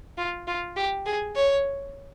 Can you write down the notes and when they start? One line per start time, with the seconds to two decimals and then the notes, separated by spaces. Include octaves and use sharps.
0.18 F4
0.47 F4
0.76 G4
1.06 G#4
1.36 C#5